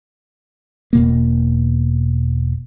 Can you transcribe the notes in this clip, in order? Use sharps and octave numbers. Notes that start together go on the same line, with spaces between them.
E1 B2 A#3